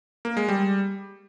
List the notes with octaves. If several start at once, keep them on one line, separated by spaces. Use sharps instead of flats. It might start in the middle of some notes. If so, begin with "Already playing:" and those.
A#3
G#3
G3